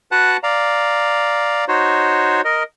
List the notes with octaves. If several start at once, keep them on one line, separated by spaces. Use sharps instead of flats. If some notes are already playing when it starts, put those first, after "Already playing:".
F#4 B4 F#5 A5 F#6
D5 F5 A#5
D#4 F#4 C5 C#5
A#4 D#5